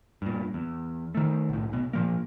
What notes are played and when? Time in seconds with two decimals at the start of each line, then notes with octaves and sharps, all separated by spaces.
0.22 G2 A#2
0.54 E2
1.15 D#3 A3
1.49 B1 A2
1.69 B1 B2
1.93 A#2 F3 A#3